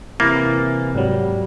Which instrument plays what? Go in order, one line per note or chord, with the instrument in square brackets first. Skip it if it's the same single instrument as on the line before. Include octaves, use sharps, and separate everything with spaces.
[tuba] C3 [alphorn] E3 [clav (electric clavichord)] A#3 [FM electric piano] E4 A6
[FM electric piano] G#2 F#3 [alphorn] G3